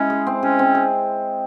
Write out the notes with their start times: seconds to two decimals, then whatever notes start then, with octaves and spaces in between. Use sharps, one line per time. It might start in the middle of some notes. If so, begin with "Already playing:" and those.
Already playing: G#3 C#4 E4
0.10 G#4
0.27 C4
0.43 C#4 G#4
0.59 C4
0.75 G#4